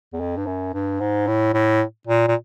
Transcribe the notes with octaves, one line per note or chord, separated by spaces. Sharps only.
E2
F2
G2
F#2
G2
G#2
A2
A2
A#2
A#2